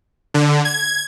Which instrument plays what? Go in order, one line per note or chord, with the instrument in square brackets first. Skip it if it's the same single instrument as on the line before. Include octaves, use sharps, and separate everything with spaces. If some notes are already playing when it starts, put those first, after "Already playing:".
[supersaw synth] D3
G#6